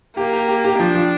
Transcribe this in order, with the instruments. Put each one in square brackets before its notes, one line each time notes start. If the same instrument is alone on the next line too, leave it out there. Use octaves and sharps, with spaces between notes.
[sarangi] A#3 [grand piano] G4
[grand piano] G4
G4
G4
[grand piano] F3 [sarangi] D4
[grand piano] F3